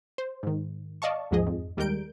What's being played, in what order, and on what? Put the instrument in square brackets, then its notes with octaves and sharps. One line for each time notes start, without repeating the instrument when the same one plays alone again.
[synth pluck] C5
G#2 D#3
D5 D#5 F5 A5 C#6
A1 D#2 G#2 F3 G#4 D#5
F2
D#2 G3 G#3 A#4 G6 D7